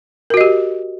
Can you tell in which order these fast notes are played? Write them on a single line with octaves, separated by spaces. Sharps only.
A#4 F#4 D#5 G4